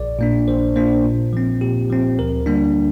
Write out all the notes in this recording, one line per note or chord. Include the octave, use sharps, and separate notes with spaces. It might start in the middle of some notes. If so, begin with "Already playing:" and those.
Already playing: A#1 D5
A#2 A#3 D4
A#1 C5
A#2 A#3 D4 C5
A#2
F3 C4
A#2 G4
F3 C4
D2 A#4
D3 G3 A#3 D4